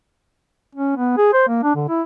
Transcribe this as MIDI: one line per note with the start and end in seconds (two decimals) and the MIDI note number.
0.75 0.97 61
0.97 1.16 59
1.17 1.32 68
1.33 1.45 72
1.48 1.61 58
1.63 1.75 62
1.76 1.86 50
1.89 2.02 64